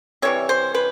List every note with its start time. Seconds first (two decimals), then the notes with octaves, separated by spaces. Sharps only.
0.22 C3 E3 G3 C#5
0.49 C5
0.74 B4